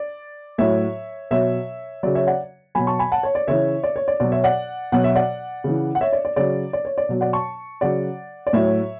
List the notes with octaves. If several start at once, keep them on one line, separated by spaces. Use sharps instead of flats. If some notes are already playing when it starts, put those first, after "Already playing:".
Already playing: D5
A2 F#3 C#5 E5
B2 F#3 C#5 E5
C#3 F#3 D5
C#5 E5
D5 F#5
B2 F#3 G#5 B5
A5 C#6
G#5 B5
F#5 A5
C#5
D5
C#3 E3 C#5 E5
D5
C#5
D5
B2 F#3 D5
C#5 E5
D5 F#5
B2 F#3 F#5
E5
D5 F#5
C#3 E3
F#5
C#5 E5
D5
D5
C#3 F#3 D5
D5
C#5
D5
B2 F#3
D5 F#5
A5 C#6
C#3 F#3 D5 F#5
D5
A2 F#3 C#5 E5